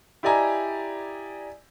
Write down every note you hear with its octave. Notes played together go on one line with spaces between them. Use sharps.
E4 G4 D5 D#5 G#5 A#5